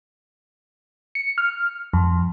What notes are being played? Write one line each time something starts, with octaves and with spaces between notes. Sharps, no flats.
C#7
F6
F2